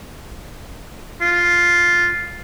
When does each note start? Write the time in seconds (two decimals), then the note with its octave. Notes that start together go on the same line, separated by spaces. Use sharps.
1.21 F4